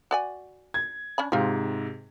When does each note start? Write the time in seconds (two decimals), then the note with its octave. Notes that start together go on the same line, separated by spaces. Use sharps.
0.11 F#4 D5 G#5
0.74 G#6
1.18 C#4 D4 B5
1.32 G#2 C3 C4 F4